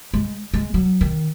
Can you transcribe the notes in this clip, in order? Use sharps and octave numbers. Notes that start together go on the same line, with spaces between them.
G#3
G#3
F#3
D#3